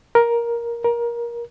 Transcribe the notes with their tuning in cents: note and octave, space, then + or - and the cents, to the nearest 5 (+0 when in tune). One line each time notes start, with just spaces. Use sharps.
A#4 +10
A#4 +20